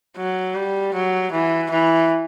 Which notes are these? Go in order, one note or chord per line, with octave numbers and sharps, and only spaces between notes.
F#3
G3
F#3
E3
E3